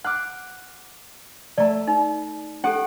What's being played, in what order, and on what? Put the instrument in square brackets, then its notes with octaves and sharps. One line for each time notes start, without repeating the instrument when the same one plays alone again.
[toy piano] F#5 [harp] D6 F6 F#6
[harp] A3 [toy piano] D5 A#5
[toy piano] D#4
[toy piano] C#4 G4 A4 [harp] F#5 D7